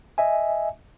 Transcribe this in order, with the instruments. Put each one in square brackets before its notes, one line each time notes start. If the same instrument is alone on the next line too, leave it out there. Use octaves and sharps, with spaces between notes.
[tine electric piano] D#5 E5 G#5